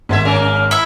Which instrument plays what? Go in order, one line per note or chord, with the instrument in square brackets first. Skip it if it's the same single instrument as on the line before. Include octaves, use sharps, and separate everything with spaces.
[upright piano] G#1 C6 G#6 [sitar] A3 D5 E5
[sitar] A#3 C#4 A#4
[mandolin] E4 E5